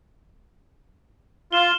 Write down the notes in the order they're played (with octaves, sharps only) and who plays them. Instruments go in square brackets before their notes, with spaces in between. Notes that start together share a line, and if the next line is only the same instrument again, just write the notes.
[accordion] F4 [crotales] F6 E7 G7